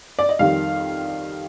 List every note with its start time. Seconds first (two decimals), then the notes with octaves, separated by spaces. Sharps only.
0.19 D5
0.29 D#5
0.39 F2 D#3 G3 F5